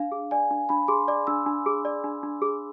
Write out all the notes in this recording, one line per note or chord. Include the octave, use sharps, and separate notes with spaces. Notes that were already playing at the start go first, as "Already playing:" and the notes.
Already playing: D4 F5
G#4
D5 G#5
D4
D4 B5
G#4 C6
D5 D6
D4 E6
D4
G#4
D5
D4
D4
G#4